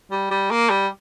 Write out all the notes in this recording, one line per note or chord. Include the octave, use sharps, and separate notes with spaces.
G3
G3
A#3
G3